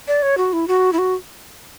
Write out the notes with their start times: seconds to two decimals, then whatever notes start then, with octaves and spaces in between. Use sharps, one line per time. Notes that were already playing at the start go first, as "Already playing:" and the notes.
0.08 D5
0.22 C#5
0.38 F#4
0.53 E4
0.68 F#4
0.93 E4
0.98 F#4